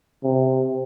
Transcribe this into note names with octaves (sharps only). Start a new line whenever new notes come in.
C3